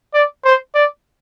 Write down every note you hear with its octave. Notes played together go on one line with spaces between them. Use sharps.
D5
C5
D5